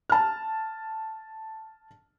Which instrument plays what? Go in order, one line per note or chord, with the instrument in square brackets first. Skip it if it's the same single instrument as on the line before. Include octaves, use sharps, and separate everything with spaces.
[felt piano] A5 F6